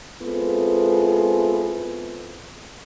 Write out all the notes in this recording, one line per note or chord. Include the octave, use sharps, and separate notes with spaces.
G#3 B3 C4 E4 F4 A4